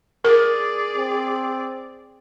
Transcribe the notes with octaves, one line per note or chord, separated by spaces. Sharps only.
G#4 A#4 D5
C4